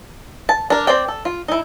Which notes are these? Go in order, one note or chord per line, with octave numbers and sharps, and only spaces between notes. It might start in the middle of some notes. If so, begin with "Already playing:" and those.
A5
D4 A#4
C4 C5 D5 G5
A4
F4
D#4 E4